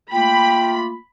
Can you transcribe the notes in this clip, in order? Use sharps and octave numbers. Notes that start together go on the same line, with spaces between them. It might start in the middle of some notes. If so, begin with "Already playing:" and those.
A3 A#3 F4 G5 B5